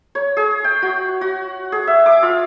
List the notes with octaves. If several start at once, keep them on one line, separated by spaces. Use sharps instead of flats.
C#5
G#4
G5
F#4
F#4
G#4
E5
D6
F4